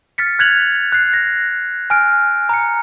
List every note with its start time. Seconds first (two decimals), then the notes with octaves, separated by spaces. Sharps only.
0.18 F6 A6 B6 C#7
0.39 F#6 G#6 F7 F#7
0.92 F#6 C7
1.13 A#6
1.90 G#5 F6 D7
2.49 A#5 C#7